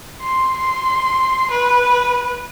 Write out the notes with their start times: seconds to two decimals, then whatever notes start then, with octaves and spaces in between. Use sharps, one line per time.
0.22 C6
0.58 C6
1.51 B4